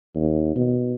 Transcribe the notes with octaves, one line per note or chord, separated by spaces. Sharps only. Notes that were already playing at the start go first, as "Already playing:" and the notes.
D#2
B2